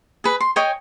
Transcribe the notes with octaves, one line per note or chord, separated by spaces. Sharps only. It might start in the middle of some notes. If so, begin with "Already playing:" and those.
G#4 B4
C6
C#5 D#5 G5 G#5